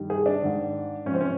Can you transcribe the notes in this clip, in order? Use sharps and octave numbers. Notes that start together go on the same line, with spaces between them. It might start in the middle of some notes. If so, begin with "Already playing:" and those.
Already playing: G2 D#3
G#4
D4
G#2 D#3
G#2 F3 C#4
C4
C#4